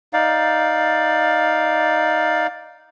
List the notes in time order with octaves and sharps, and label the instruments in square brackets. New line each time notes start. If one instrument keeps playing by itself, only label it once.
[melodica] D#4 D5 F5